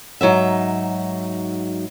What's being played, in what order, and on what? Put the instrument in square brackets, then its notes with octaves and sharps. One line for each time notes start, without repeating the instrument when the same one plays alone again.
[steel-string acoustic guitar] G#2 F#3 D#4 E5